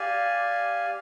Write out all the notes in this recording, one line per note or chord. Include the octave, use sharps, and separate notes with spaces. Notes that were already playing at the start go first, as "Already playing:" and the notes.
Already playing: G4 D5 F5 G#5